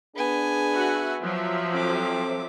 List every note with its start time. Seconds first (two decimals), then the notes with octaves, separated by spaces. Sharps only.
0.16 B3 D4 G#4 G#5
0.73 F#4 E5 F#5
1.21 F3 F#3 E5
1.75 C4 A4 D6